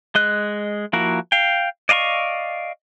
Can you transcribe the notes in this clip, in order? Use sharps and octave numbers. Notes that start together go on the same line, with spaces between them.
G#3 D#5 F#6
F3 A#3 E4 F#4 A#4
F5 G5
D5 D#5 F5 A#5 C#6